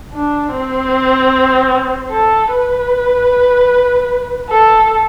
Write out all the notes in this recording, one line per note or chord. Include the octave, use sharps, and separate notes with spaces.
D4
C4
A4
B4
A4